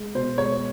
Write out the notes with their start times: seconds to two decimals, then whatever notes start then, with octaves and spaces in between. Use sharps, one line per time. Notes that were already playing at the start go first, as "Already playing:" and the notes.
Already playing: G#3
0.15 B2 C5
0.38 G#3 C#5